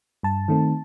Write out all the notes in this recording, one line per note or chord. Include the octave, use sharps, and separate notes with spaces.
G2 A5
D#3 A3 C4